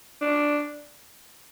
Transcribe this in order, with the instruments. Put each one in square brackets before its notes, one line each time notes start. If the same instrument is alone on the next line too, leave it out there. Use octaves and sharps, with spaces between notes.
[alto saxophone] D4